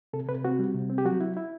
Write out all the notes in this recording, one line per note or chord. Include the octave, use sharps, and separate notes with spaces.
C3 A4
C3 B4
C4 F#4
G3
C3
C4
G4
F#3 F#4
E4
E4